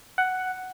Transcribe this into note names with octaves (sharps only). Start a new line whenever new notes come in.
F#5